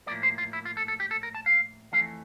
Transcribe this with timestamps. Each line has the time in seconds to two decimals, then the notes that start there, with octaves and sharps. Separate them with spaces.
0.07 A2 F3 A#3 D5
0.23 C5
0.38 F4
0.53 E4
0.65 F4
0.77 A4
0.88 A4
1.00 G4
1.11 A4
1.23 A#4
1.35 A5
1.46 F5
1.92 F2 E3 A3 F5